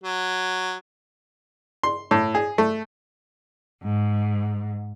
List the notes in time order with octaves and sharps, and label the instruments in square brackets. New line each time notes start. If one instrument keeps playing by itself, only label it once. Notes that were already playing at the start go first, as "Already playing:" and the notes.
[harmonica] F#3
[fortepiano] C6
A2
G#4
A3
[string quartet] G#2